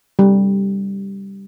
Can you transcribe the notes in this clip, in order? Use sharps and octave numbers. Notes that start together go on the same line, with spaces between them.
G3